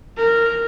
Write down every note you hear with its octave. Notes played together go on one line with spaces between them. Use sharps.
A#4